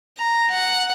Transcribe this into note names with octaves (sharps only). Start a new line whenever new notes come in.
A#5
F#5